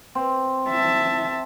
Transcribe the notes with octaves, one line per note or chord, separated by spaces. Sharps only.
C4
E5 A5